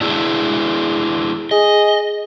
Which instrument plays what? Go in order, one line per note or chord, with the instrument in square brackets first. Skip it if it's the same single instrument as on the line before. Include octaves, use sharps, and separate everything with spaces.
[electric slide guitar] D4 E4 G#4
[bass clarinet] G#4 [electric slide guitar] D#5